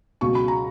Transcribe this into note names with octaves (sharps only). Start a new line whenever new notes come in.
C#2 B2 F#3 C#6
B5
A#5